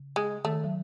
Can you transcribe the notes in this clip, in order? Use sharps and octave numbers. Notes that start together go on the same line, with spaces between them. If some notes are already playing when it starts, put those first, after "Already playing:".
Already playing: C#3
G#3
D#3 A3
F#3